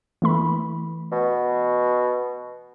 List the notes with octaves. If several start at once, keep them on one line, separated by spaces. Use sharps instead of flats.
E3 A3 B5
B2